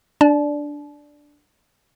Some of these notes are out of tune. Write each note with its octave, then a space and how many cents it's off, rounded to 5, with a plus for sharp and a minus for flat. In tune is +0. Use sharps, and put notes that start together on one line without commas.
D4 +0 D5 +0 A5 -35